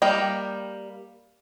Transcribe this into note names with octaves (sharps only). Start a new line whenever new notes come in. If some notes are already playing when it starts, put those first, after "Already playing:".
G3 A#3 D#5 G5